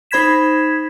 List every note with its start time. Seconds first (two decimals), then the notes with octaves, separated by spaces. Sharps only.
0.11 D#4 C5 B5 G#6 B6 E7